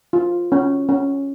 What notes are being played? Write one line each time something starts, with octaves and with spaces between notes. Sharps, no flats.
F4
C#4
C#4